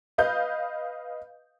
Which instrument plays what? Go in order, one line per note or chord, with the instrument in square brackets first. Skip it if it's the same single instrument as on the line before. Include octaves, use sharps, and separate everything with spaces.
[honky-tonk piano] B4 D#5 F5 G6